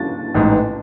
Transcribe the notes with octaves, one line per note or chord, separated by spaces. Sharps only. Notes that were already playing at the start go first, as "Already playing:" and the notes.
Already playing: A6
A1 G#2 E3